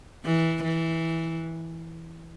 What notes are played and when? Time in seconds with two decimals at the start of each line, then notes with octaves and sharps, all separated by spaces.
0.25 E3
0.64 E3